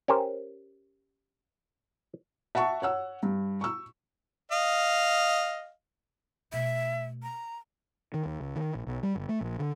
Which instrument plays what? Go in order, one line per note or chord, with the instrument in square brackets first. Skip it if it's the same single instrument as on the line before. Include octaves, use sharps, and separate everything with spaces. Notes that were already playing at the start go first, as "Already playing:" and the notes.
[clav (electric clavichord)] C#4 G4 A#4 C5
[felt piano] E5 F#5 A5 C#6
C#5 F#5 E6
G2
C#6 E6
[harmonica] D#5 F5
[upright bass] B2 A3 [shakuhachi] E5
[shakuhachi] A#5
[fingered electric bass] D#3
D#2
C#2
D#3
A#1
B1
G3
G1
A3
A#1
D3